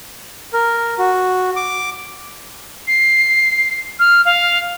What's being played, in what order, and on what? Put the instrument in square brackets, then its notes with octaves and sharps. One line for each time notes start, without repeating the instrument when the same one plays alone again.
[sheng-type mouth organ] A#4
F#4
D6
[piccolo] C7
F6
F5